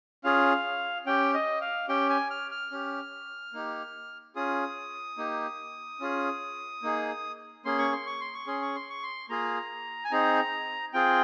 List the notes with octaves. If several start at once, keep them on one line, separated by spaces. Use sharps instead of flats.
C#4 F4 G#4 F5
C#4 G4 G5
D#5
F5
C#4 G4 G5
G#5
F6
F6
C#4 G4
A#3 D#4 G4
C#4 F4 G#4 D#6
A#3 D#4 G4
C#4 F4 G#4
A#3 D#4 G#4
A#3 C#4 G#4 C6
C#6
C6
C#6
C6
C#6
C#4 G#4 C6
C#6
C6
C#6
C6
A#3 F4 G#4 A#5
G#5
C4 D#4 G#4 A#5
C4 F4 G#4 G5